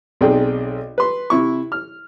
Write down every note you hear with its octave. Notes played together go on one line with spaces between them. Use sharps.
B1 C4 D#4 G#4 D5 G5
B4 C6
C3 E4 C#6
F6